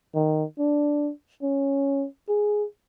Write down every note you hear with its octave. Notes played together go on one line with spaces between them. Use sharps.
D#3
D4
C#4
G#4